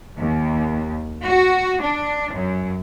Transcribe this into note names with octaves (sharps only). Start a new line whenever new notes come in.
D#2
F#4
D4
F#2